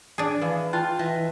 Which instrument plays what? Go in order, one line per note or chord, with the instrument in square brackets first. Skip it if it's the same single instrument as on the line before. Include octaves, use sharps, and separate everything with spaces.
[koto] D4 G#4 [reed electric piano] G#5
[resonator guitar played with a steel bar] A2 E3 [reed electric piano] B4 F5
[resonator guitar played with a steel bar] F4 [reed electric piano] G5 A5 F#6
[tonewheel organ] E3 [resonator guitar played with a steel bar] D#5 E5